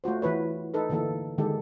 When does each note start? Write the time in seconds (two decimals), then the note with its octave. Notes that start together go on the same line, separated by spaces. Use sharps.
0.04 A3 F4 F#4 C5
0.22 E3 E4 B4 C#5
0.74 D#4 A4 B4
0.90 D3 E3 A#3 A4
1.38 D3 D#3 G#3 G4 A4